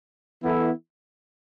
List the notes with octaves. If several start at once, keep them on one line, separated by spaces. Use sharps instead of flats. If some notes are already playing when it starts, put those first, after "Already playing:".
E3 B3 E4 A4